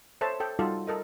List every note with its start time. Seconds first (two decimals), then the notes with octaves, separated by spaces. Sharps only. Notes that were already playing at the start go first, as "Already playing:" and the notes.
0.21 A4 C5 C#5 E5 A5
0.40 A4 G5
0.59 G3 D#4 F4 F#4 A4
0.87 A4 A#4 D#5